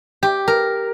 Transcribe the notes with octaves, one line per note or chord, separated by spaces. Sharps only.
G4
A#4